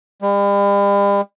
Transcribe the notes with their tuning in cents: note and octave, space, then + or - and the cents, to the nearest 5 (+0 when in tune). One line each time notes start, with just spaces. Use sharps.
G3 +40